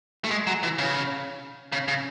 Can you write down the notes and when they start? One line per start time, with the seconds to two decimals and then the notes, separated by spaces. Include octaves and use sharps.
0.24 A3
0.31 G#3
0.47 F#3
0.63 E3
0.78 C#3
1.72 C#3
1.88 C#3